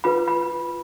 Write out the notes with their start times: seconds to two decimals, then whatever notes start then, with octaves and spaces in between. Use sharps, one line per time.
0.04 F4 B4 B5
0.28 B5